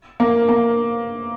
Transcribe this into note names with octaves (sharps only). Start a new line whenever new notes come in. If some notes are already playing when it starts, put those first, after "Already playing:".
A#3
A#3